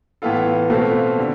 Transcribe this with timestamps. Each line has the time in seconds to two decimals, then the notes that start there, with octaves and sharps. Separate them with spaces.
0.22 A2 E3 B3 F4 A4
0.70 B2 A3 C4 F4 A4
1.18 D3 G3